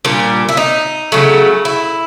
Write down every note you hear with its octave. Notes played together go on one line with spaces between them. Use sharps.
A#2 G3 D4
E4
D#4
C#3 F#3 A3
E4